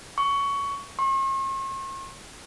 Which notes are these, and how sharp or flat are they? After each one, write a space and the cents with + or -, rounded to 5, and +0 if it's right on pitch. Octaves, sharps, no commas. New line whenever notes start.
C#6 +15
C#6 -45